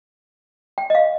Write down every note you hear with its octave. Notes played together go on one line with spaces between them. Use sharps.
G5
D#5
F5